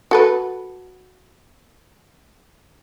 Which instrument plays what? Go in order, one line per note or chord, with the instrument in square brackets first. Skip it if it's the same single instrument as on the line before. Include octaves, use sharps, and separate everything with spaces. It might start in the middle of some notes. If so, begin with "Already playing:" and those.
[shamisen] F#4 A4 B4